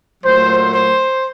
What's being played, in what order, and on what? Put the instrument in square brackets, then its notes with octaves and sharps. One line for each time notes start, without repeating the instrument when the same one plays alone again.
[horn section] A#2 F#3 A3 C5
C5